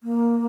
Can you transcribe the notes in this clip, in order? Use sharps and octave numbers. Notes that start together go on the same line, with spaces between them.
A#3